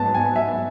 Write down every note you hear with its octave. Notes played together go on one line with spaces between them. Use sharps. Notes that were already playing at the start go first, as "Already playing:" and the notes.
Already playing: G#2 F#3 B3 A5
G#5
E5